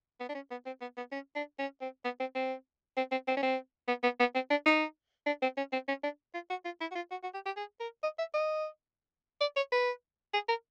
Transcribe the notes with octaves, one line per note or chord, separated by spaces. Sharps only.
B3
D4
C#4
B3
C4
B3
B3
C#4
D4
C#4
C4
B3
C4
C4
C4
C4
C4
C#4
C4
B3
B3
B3
C4
D4
D#4
D4
C4
C#4
C4
C#4
D4
F4
F#4
F4
E4
F#4
F4
F#4
F#4
G4
G4
G#4
A#4
D#5
E5
D#5
D5
C#5
B4
G#4
A#4